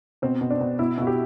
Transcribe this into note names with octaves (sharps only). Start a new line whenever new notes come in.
B2 C4
B2
D4
B2
B2 E4
B2 F#4
G4